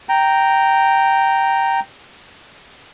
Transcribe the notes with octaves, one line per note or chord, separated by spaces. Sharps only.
G5 A#5